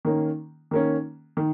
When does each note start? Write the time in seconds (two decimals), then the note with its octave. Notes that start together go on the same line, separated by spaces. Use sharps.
0.05 D#3 A#3 C#4
0.71 D#3 A#3 C#4
1.37 D#3